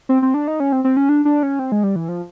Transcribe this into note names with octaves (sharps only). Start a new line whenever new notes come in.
C4
C4
D4
D#4
C#4
C4
C4
C#4
D4
D4
C#4
C4
G#3
G3
E3
F3